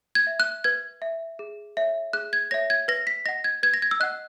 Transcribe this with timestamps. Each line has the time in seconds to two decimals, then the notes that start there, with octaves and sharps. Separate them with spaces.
0.15 G#6
0.27 E5
0.40 F#6
0.64 B4 G#6
1.02 E5
1.39 G#4
1.77 C#5 E5
2.13 G#4 F#6
2.33 G#6
2.51 C#5 E5 A#6
2.70 G#6
2.88 B4 A#6
3.07 B6
3.25 D#5 A#6
3.28 F#5
3.44 G#6
3.63 B4 G#6
3.74 A#6
3.82 G#6
3.91 E6
4.00 D#5 F#5 F#6